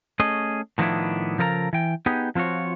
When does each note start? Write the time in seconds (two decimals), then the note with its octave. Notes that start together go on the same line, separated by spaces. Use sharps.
0.20 A3 C#4 G#4 D#5
0.78 A2 D#3 F3 B3 D4 E4
1.38 C#3 F3 A4 A#4 D5 A#5
1.73 E3 G5
2.06 B3 D#4 G4 G#4
2.35 F3 C4 F4 F#4 C#5